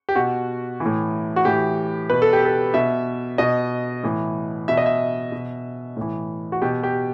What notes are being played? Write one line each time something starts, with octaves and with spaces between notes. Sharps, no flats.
G4
B2 F#4
E3
A2
F#4
A2 E3 G4
B2 B4
A4
G4
A4
B2 E5
B2 D#5
A2 E3
B2 E5
D#5
E5
B2
A2 E3
F#4
B2 G4
G4